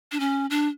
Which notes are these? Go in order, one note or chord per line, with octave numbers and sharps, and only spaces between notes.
D4
C#4
D4